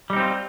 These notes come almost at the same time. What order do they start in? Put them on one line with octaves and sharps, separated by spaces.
G3 D#4 C4 F4